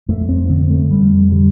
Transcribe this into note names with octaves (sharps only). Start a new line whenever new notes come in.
F2 A3
C4
D3 C4
A3
F2 G3
D3 G3